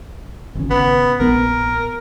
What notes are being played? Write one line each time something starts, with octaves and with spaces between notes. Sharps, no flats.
G#1 C#3
B3
A#1 B3 A#4